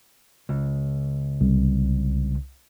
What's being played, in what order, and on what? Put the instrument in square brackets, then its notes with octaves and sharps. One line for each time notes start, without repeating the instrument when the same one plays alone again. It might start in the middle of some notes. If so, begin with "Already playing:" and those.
[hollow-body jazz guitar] C#2
[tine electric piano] C2